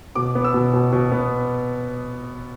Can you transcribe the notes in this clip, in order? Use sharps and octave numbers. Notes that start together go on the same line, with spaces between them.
B2 D6
B3
E6
B2
B2
B2
B3